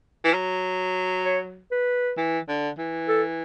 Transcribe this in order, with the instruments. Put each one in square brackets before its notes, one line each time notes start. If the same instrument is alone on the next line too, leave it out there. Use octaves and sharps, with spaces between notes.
[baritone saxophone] E3
F#3
[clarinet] C#5
B4
[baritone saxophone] E3
D3
E3
[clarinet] A4